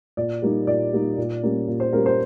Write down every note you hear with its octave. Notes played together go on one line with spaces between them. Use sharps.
A#2 D5
G3 A#3 D#4
A#2 D5
G3 A#3 D#4
A#2
G3 A#3 C#4
A#2
C5
G3 A#3 C#4 A#4
C5